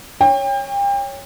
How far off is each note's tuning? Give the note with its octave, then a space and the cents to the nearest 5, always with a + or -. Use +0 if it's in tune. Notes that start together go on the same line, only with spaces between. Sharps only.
C#5 +0 G5 +35